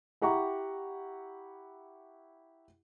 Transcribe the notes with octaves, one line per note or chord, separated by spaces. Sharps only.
E4 G4 F#5 A#5 C#6